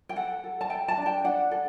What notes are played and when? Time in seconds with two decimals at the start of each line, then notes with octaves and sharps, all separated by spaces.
0.09 G5
0.16 A4 F#5
0.44 A4
0.61 A5
0.70 A4 G5
0.88 A5
0.97 D4
1.06 G5
1.24 D4 F#5
1.51 A4